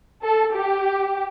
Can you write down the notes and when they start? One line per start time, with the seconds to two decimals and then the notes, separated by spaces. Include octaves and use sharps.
0.23 A4
0.55 G4